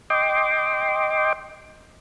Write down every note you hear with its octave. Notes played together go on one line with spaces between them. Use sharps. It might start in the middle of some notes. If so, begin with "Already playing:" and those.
D#5 G5 C6 D6